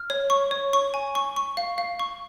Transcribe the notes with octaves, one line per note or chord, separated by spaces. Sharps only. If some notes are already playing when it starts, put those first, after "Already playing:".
Already playing: F6
C#5
C#6
C#5
C#6
G#5
C#6
C#6
F5
F5
C#6